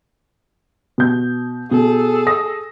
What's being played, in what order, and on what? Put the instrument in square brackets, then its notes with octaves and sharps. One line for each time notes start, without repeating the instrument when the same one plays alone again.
[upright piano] B2 G6
[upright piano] B2 [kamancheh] G#4 A4
[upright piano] D#6 A#6